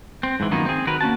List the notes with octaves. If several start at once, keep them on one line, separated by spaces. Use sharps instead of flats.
C4
G#2 E3
F#2 D#3 F3 A#3 B3 D#4
C4 G#4
D#3 F#4 A#4 B4
A#3 C#4 F#4 A5